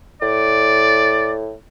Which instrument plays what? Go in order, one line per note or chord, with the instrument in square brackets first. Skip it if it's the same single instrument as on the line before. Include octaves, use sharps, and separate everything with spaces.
[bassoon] A2 [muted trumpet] D5